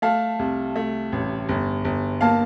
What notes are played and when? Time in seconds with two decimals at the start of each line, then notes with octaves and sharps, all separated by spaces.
0.02 A3 F5 A5
0.39 C2
0.75 A3
1.12 A1
1.49 G1
1.85 G1
2.21 A#3 F5 A5